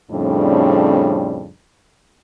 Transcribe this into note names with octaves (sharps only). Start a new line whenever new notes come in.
F2 A2 C#3 G3 C4 D4